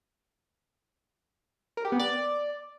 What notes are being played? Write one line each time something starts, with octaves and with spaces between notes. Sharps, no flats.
A#4
G4
B3
D5